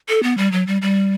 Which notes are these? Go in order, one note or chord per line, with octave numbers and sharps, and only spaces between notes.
A4
B3
G3
F#3
G3
G3